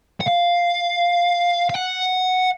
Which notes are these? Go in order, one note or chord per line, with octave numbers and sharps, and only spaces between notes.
F#5
F5
F5
F#5